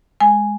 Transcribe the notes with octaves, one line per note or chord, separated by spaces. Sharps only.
G#3 G#5